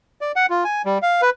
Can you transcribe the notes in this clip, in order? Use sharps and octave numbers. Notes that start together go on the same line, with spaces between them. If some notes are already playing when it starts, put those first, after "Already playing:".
D5
F#5
F4
G#5
G3
F5
B4